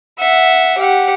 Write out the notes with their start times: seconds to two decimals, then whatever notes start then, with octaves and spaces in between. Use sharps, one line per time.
0.18 E5 F#5
0.78 G4 F#5